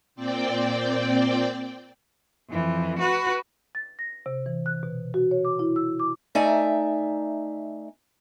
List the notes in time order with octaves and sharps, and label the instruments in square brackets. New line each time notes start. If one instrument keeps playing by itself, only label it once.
[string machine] A#2 C4 D5 G5
[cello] F2 E3
F#4 B4
[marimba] A6
A#6
C3
E3
F#6
B2
F#4
C#5
D6
E4
E6
D6
[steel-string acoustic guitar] A3 D#4 D5 E5 G#5 A#5